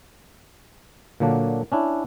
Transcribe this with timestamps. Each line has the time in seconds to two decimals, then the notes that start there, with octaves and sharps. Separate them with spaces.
1.20 A#2 D3 F#3 A#3 D4
1.72 C#4 D4 E4